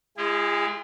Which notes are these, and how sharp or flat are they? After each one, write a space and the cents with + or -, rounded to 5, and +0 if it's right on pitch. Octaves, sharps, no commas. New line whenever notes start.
G#3 +10 E4 +45 G#4 -35